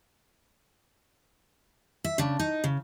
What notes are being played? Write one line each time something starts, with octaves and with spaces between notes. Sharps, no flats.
E5
C#3 D4
D#4
C#3